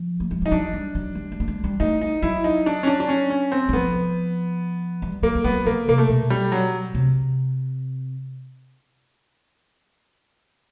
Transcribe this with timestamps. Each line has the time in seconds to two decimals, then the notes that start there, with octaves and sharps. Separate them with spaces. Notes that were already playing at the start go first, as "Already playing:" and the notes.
Already playing: F3
0.20 A3
0.31 G#3
0.41 G3 D#4
0.52 F#3 D4
0.73 G3
0.95 F#3
1.15 G3
1.32 G#3
1.40 A3
1.48 G#3
1.64 G3
1.80 A3 D#4
2.02 D#4
2.22 F#3 E4
2.44 D#4
2.66 D4
2.83 C#4
2.87 D4
3.00 D4
3.09 C#4
3.30 C#4
3.52 C4
3.69 E3
3.73 F3 B3
5.02 G3
5.23 F#3 A#3
5.35 G3
5.44 F#3 B3
5.66 C#3 A#3
5.88 C3 A#3
5.98 A3
6.09 B2
6.30 G3
6.52 F#3
6.95 C3